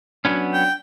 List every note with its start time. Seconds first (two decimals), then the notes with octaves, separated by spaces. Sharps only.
0.25 F#3 B3 C#4 D4
0.53 G5